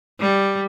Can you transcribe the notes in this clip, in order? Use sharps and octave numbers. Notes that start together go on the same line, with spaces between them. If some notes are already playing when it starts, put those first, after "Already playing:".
G3